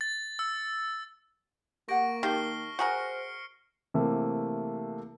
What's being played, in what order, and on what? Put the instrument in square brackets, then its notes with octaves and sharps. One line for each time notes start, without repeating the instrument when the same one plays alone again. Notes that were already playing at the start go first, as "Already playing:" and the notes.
[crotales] A6
E6
[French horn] A#3 [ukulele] G4 F#5 [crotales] C#6 A#6 D7
[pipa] D#3 [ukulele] G4 F5 A5 [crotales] F6 C7 G7
[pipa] F#4 G#4 A#4 [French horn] C5 [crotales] C#7
[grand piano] C3 E3 A3 A#3